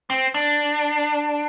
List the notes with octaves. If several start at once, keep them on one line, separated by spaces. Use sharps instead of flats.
C4
D4